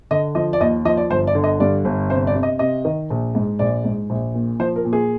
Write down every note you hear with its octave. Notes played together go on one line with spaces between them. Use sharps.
D3 D#5
F3 D#5
D5
D#2 D#5
F3 D#5
D5
G1 C5
D5
D3
D#5
G2 D5
G1
C3 C5
D5
C3
D#5
C3 D#5
D#3
A#1
G#2
A#1 D5
G#2
A#1
A#2
F3 C5
A#4
A#2
G#4